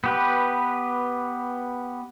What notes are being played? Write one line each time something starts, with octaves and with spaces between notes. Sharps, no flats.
B3 G4 B4